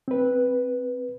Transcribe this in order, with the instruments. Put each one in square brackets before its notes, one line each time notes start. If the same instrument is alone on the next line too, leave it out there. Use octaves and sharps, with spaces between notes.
[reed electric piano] C4 B4